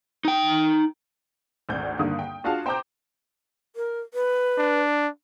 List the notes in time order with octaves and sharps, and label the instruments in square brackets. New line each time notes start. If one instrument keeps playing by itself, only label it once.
[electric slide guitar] D#4 G5
[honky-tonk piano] G#1 D2 D5 G6
G2 D3 D#3 A#3 D#6
G5
D4 F4 F#4 G#4 F5 A5
C5 G5 A5 A#5 D6 G6
[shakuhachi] A#4
B4
[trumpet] D4